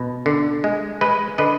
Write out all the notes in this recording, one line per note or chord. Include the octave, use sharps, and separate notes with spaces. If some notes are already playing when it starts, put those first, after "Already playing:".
Already playing: B2
D3
G#3
G#3 B4 D#5
D3 B4 D#5